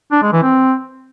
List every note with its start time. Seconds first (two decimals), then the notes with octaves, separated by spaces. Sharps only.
0.12 D4
0.22 G#3
0.32 E3
0.43 C4